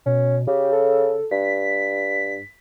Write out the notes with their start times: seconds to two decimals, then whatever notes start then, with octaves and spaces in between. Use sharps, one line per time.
0.06 B2 C#4
0.48 C#3 G4
0.72 A4
1.31 G2 B6